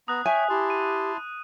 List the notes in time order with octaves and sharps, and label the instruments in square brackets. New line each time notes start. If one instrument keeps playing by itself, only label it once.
[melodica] B3 A#5 [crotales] D#6 F#6
[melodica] C#5 G5 [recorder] E5 [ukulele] G#5
[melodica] E4 A5 C6 [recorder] G4
[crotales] D#7